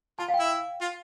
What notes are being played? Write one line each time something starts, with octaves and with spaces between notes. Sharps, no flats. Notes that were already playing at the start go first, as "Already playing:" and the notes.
F4 A5
F5
G5
E4
F4